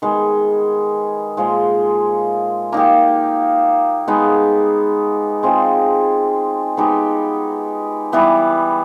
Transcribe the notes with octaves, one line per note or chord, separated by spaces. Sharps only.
D#3 G#3 B3
A#2 F3 G#3
A#3 D#4 G4
G#3 B3 D#4
G#3 C4 F4 G#4
G#3 B3 D#4 G4
E3 G3 B3 E4